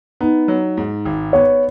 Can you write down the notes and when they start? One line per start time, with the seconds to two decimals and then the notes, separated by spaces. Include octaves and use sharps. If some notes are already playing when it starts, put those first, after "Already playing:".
0.21 B3 D#4
0.48 F#3
0.77 G#2
1.05 G#1
1.33 B3 C#5